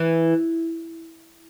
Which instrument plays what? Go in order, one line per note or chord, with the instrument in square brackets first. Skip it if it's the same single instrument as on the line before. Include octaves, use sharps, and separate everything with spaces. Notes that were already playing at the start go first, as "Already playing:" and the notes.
Already playing: [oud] E3